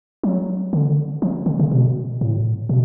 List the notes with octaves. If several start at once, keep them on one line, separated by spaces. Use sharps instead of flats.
F#3
D3
F3
D3
C#3
B2
A2
B2